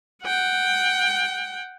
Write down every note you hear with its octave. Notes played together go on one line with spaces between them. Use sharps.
F#5 G5